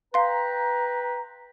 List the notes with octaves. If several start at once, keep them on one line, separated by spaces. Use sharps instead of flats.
B4 F5 G5 A#5 C6